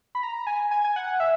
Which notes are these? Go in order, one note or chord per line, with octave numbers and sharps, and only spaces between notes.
B5
A#5
G#5
G#5
G#5
F#5
E5